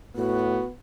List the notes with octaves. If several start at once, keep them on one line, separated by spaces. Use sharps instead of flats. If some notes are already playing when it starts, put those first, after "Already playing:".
A2 B3 F#4